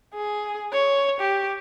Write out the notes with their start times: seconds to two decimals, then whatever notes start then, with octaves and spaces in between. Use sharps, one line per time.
0.15 G#4
0.73 C#5
1.21 G4